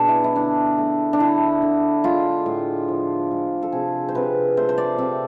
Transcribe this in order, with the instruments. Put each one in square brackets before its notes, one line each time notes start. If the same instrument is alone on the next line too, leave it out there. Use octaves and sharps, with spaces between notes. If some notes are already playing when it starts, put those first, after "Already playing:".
Already playing: [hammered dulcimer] B2 D4 G#4
E4
E4
D3 D4
A3
D4
D3 E4
D3
G#3 F4
A2
F3
G#3
A4
C3 G#4
C5
C3 B4
A3 C5
C5
D5
C3 E5